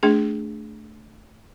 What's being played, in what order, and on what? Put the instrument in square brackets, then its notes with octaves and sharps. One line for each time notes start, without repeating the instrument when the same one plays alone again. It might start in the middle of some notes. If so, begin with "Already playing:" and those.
[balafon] A3 D4 G#4